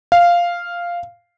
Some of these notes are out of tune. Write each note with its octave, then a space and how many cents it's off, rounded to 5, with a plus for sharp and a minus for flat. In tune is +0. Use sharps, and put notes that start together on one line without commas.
F5 -5